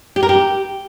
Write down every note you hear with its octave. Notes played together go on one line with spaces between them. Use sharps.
G4
A#4
G4